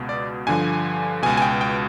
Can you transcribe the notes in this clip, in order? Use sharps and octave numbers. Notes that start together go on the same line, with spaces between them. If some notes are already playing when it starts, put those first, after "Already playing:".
Already playing: C#2 B2
D5
G2 D3 F3 G#5
C#2 B2 G#5
G#5
G5
G5